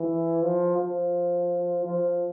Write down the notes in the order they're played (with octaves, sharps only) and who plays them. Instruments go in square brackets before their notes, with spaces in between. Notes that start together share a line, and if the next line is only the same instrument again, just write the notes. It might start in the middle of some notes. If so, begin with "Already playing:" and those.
Already playing: [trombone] E3
F3
F3
F3